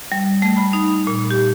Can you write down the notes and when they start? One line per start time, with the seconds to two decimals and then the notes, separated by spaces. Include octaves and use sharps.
0.12 G3
0.42 A3
0.57 B5
0.73 D#4
1.07 A#2
1.31 G4